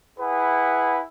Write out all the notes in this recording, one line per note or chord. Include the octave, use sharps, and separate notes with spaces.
E4 G#4 B4 F#5